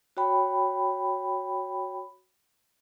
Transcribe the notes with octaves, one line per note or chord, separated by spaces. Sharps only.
F#4 C#5 G5 B5